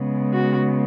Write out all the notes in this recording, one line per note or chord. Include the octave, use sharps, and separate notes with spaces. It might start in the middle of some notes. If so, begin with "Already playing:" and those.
Already playing: C#3 G#3 B3
F#4